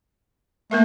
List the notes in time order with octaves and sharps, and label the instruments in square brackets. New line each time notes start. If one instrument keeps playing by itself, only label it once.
[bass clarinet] A3 [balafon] A#3 A#4 E5